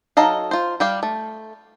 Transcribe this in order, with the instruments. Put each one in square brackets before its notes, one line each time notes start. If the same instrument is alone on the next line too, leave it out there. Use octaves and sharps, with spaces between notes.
[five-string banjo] F#3 D#4 A4 D#5 F5
F4 C5
G3 G4 F5
A3